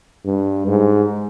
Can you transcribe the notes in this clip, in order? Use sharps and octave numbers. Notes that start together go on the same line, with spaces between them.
G2
G#2